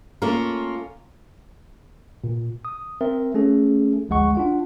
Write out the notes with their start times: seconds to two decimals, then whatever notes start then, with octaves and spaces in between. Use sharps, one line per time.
0.22 A3 A#3 C#4 F4 A#4
2.24 A#2
2.65 D#6
3.01 C4 A#4 E5
3.34 A3 C#4 G#4 A4
4.09 G1 D2 F3 G#3 F#5 C#6
4.35 D4 F4 F#5